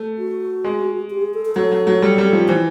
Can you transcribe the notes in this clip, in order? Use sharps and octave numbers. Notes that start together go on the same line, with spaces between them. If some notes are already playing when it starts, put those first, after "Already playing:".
Already playing: A3
F#4
G#3
G4
G#4
A4
A4
F#3 A4
F#3
F#3
G3
G3
F3
E3 C5